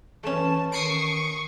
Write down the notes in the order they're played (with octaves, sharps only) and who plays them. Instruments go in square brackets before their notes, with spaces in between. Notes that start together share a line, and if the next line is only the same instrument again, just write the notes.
[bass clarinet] E3 [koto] A3 C#4 [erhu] A5
[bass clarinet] D#3 [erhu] C#6 [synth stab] D#6 C7 D7